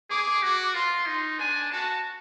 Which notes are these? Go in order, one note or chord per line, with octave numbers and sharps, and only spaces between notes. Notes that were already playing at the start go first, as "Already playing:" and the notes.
G#4 D6
F#4
F4 C6
D#4
D4 G#5
F#4 A5